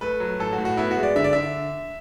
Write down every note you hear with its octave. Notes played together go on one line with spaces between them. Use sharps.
A3 B4
F#3
A2 A4
F#4
A2
F#4
B3 E4
F#4
G#3
D5
D3 E5
D5
D3 E5